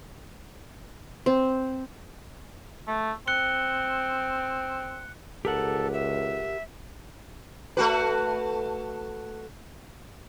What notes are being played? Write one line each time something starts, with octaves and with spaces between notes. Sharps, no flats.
C4
A3
C4 F#6 C#7 G7
C#2 G4 A4 A#4 F#5
E5
A3 F#4 B4